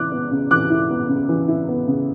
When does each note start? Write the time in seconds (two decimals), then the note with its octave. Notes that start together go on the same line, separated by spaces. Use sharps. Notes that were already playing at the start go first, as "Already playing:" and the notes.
Already playing: C#3 E3 E4 D6 F#6
0.12 B3
0.31 C#3
0.51 E3 D6 F#6
0.70 E4
0.90 B3
1.09 C#3
1.29 E3
1.48 E4
1.68 B3
1.87 C#3